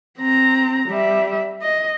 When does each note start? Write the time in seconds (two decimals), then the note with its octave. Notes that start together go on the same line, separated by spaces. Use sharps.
0.19 C4 A#5
0.89 G3 E5
1.62 D#5